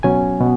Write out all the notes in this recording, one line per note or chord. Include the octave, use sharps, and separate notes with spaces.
B2 F#3 C#4 G#5
B2